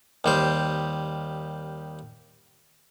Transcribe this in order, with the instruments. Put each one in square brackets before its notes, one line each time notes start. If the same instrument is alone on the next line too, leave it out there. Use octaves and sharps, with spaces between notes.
[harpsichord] D#2 G3 C5